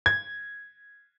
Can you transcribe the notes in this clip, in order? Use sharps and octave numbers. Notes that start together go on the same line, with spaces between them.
G#6